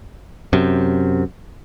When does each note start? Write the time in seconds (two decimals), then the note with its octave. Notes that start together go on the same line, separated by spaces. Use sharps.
0.53 F#2 C3